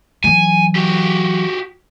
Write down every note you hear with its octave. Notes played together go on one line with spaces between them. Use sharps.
E3 F#3 G#5
F#4 G4